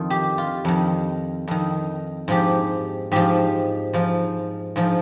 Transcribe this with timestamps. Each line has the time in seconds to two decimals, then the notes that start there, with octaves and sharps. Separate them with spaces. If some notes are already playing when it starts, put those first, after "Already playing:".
Already playing: F2 D#3 F4
0.10 G4
0.38 F4
0.65 F2 D#3
1.48 F2 D#3
2.28 G#2 F3 G4
3.12 G#2 F3 G4
3.93 G#2 F3
4.76 G#2 F3